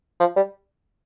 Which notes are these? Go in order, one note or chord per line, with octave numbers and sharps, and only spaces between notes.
F3
G3